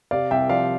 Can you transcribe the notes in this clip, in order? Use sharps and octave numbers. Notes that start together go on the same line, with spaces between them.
C3 D5 F5
C2 E5 G5
F3 D5 F5